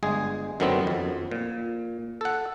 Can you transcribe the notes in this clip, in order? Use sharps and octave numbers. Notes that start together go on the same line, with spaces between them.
G1 G#3 G#4
F#2 D3 D#3 F#3 B3 C4
F2
A#2
A4 F#5